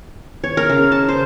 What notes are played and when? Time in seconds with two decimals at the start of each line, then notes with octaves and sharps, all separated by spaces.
0.44 C#5
0.57 A#4
0.69 C#3
0.92 A5
1.08 C5